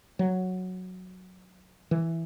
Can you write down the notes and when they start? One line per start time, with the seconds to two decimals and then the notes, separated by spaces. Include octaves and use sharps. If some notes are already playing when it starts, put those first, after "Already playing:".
0.19 F#3
1.91 E3